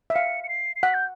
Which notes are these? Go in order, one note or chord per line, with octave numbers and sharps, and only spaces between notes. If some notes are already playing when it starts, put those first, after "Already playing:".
E5
F5 C#7
C#7
C7
C7
F#5 B6
G6